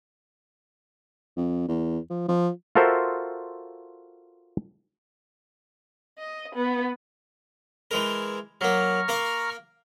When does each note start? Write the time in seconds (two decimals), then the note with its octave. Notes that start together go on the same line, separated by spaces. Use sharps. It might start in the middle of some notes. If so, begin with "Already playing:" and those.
1.37 F2
1.68 E2
2.10 F3
2.28 F3
2.75 F4 F#4 A4 A#4 C5 E5
6.19 D#5
6.55 B3
7.91 E3 G#3 A#4
8.61 F#3 A#3 A#5 C#6 F6
9.08 A#3 A#4 F5